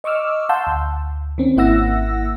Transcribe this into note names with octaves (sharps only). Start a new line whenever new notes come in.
D#5 C#6 D6 E6 F6
F5 F#5 A5 C6 E6 G6
D2
D#3 C4 C#4
G#1 A#3 E4 F#5 E6 A#6